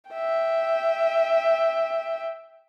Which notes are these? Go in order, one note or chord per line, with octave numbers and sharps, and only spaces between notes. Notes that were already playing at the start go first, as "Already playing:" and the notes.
E5 G5